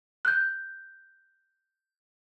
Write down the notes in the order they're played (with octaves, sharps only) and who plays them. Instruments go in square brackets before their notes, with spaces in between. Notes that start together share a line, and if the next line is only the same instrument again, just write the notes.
[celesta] F#6 G6